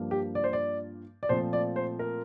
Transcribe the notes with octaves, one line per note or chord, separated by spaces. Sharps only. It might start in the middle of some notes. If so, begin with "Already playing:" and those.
Already playing: G2 F3 A#3
G4
D5
C5
D5
D5
A#2 F3 A3 C4 C5
D5
C5
A#4